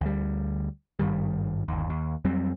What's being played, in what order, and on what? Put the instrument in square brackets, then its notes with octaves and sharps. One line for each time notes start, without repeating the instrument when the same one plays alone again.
[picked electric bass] D2 G3
G#1 G2 D#3 G3
G1 D#2
D#2
F2 F#3 G3 C4